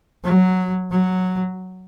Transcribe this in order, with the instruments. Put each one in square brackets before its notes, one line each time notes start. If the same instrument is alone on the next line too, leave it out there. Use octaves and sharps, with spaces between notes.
[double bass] F#3
F#3